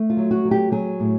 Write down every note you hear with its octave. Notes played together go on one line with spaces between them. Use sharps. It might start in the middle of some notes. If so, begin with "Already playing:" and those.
Already playing: A3
F4
F#3
F#4
F#3
G4
F#3 G#4
A2